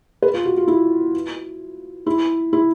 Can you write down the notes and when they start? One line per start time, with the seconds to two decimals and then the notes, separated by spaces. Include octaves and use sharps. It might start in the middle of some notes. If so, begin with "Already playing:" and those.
0.22 B4
0.34 F4
0.45 F#4
0.57 F4
0.68 E4
2.06 E4
2.53 E4